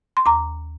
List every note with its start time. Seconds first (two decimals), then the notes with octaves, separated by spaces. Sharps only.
0.17 C6
0.26 D#2 A#5 D6